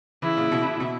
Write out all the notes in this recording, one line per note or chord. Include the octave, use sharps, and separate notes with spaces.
C#3 E3 E4
A#2 C#3
B2
B2
B2